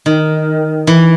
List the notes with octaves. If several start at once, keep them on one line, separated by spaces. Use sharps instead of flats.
D#3
E3